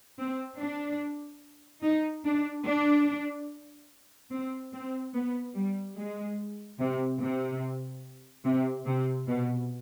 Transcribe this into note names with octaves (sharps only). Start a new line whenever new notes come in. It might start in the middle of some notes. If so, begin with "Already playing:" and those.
C4
D4
D#4
D4
D4
C4
C4
B3
G3
G#3
C3
C3
C3
C3
B2